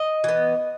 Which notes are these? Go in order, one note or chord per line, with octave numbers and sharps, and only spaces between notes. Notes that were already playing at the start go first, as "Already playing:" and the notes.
Already playing: D#5
E3 B3